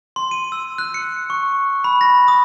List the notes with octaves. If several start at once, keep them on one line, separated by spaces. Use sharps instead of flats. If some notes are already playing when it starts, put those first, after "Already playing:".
C6
D#7
E6
F#6
C#7
C#6
B5
A#6
D#6